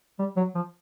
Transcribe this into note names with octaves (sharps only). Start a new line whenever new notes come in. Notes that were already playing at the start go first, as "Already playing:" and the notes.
G3
F#3
F3